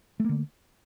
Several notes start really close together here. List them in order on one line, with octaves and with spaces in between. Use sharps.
A3 A#3 D3